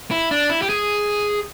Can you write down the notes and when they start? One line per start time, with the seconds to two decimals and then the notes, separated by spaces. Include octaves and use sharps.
0.11 E4
0.31 D4
0.49 E4
0.62 G4
0.69 G#4